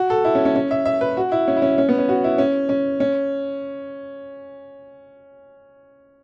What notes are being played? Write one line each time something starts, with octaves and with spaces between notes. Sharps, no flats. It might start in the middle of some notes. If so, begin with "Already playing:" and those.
Already playing: F#4
A4
E4
C#4
C#4
C#4
E5
E5
B4
F#4
E4
C#4
E4
C#4
C#4
B3
C#4
F#4
E4
C#4
C#4
C#4